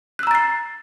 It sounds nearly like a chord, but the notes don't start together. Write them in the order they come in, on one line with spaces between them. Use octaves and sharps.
F#6 E6 A#5 A6 C7